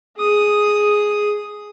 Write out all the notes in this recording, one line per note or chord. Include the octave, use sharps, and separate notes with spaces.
G#4 D#6